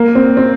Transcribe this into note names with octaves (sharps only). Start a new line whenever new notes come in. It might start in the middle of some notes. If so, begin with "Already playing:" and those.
Already playing: A#3
C4
C4